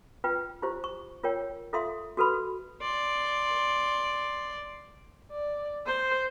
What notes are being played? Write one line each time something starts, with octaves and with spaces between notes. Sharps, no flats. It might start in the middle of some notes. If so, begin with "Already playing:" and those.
F4 B4 G5
E4 F4 G4 C5
C#6
F4 A#4 C#5 G5
F4 A4 E5 F5 C6 D#6
F#4 A4 B4 B5
D5 C6
D5
C5